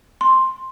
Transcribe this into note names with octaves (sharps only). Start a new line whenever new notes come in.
C6